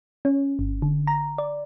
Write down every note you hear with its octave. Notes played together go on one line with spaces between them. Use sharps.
C#4
G1
D3
A#5
D5